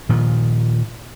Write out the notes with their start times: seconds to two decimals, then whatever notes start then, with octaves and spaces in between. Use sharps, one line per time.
0.09 A#2 D#3 F3